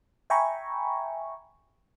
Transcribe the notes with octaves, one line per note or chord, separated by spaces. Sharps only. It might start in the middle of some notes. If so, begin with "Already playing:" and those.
E5 G5 G#5 A#5 B5 C#6